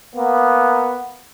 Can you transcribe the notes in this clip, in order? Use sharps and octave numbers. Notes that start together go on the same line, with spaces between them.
A#3 B3